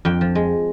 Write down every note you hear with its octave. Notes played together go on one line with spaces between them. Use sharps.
F2 G5
F3
G#3